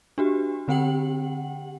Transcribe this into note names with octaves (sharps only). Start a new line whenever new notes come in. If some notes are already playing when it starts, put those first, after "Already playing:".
D4 F#4 G4
D3 C4 G4 F#5 G5 F#7